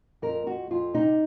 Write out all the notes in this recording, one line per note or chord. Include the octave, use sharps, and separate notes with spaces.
F2 A#4
F2 F#4
F2 F4
C3 D#4